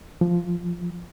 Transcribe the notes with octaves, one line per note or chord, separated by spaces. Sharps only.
F3